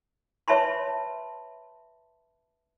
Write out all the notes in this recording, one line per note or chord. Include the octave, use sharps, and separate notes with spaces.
B4 C#5 E5 A5 B5 C6